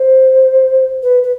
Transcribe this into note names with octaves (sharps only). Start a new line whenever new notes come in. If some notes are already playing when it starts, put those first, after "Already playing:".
Already playing: C5
B4
B4